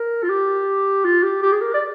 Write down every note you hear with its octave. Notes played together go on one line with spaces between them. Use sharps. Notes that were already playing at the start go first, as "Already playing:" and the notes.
Already playing: A#4
F4
G4
F4
G4
G4
G#4
A#4
D5